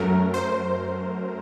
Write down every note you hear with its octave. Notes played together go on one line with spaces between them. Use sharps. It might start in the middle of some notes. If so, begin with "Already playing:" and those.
Already playing: F#2 F#3 A3 A#4
C5